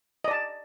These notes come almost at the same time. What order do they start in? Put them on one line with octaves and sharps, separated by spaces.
D#5 D5 A5